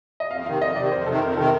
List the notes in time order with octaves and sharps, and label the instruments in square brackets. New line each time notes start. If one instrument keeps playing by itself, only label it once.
[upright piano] D#5
[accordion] F2 [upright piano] F5
[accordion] C3 D#3 [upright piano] F5
[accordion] F2 [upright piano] D#5
[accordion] C3 D#3 [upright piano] D5
[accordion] F2 [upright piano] C5
[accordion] C3 D#3 [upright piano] A4
[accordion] F2 [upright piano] A#4
[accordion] C3 D#3 [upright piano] A4